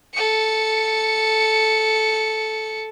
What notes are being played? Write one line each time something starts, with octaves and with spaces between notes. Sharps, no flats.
A4 C#7